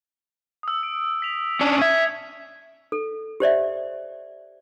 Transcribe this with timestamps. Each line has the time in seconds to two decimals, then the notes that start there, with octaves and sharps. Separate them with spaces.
0.63 D#6 E6
0.83 D7
1.22 B6 F7
1.61 C#4 D4
1.82 E5 G#6 C#7
2.92 A4
3.40 G4 C5 D5 E5